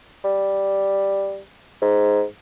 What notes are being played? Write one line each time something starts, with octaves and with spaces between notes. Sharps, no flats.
G3
G#2